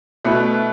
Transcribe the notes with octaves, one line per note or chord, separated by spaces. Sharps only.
B2 A3 E4 B4